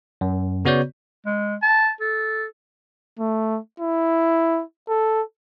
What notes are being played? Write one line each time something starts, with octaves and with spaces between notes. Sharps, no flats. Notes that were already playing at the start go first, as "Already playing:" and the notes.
F#2
C#3 B3 F#4 C#5 D5 G6
G#3
A5
A4
A3
E4
A4